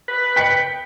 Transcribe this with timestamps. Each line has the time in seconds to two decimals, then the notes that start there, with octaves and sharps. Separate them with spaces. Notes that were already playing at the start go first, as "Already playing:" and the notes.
0.08 B4
0.36 G5 B6 C#7